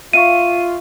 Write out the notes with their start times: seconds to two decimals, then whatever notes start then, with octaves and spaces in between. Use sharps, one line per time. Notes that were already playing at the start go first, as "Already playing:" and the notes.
0.13 F4 E5 F5 C#6 D#7